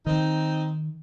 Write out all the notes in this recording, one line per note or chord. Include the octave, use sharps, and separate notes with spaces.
D#3 C4 D#4